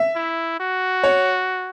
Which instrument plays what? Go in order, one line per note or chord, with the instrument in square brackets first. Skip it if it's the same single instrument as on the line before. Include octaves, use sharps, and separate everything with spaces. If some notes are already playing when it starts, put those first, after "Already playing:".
Already playing: [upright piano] E5
[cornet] E4
F#4
[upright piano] C#5